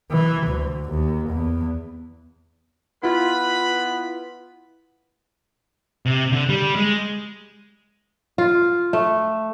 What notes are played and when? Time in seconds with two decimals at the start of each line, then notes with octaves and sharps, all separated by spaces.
0.11 E3
0.47 D2
0.90 D#2
1.30 E2
3.03 B3 E4 F4 B4 B5
6.06 C3
6.32 D3
6.49 G3
6.76 G#3
8.38 F4
8.93 A3